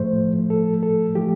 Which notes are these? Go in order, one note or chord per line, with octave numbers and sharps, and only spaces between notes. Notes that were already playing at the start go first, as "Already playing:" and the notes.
Already playing: A2 F3 A3 C5
A4
A4
F3 A3 G4